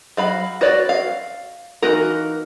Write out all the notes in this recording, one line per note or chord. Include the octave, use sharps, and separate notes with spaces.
F#3 F5 B5
F#4 B4 C#5 D5
F5
E3 A#3 D#4 F#4 A#4